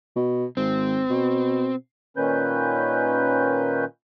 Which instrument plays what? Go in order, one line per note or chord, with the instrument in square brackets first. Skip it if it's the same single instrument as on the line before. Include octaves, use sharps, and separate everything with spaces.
[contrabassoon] B2
[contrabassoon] G#1 [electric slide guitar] C4
[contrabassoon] B2
[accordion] A#2 D#3 C#4 B4 G6